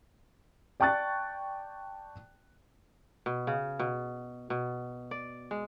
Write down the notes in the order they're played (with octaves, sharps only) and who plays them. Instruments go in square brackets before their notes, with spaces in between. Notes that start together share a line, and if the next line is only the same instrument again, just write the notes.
[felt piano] D5 G5 A5 C#6 F#6 A6
[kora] B2
C#3
B2
B2
D5
G#3